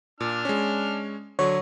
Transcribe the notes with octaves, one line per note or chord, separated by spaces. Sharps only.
A#2 D4 F6
G#3 C#4
D3 F#3 C#5